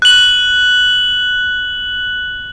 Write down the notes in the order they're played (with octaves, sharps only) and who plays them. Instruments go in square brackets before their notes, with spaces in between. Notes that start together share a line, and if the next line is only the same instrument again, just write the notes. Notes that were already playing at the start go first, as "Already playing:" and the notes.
[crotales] F#6 F#7